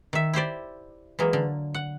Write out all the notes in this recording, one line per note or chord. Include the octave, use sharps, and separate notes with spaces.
D#3 E5
E4 G4 C5 D5
E3 F#3 G#3 A#3
D3
F#5